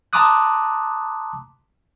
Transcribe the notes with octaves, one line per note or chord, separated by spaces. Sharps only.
A5 A#5 C6 D6 D#6 F#6